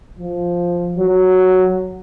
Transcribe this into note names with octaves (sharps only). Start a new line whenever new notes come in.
F3
F#3